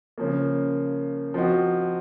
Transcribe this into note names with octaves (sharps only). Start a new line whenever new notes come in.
C#3 F3 A#3
F3 C4 D#4 F#4